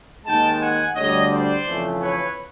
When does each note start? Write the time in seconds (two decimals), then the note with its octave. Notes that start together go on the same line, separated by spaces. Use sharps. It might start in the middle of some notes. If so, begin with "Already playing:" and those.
0.25 D#2 D#3 G#3 G5 A5
0.60 F#5 G#5
0.95 D2 D3 G3 C#5 D#5
1.30 C5 D5
1.65 F2 C#3 E3 A3
2.01 B4 C#5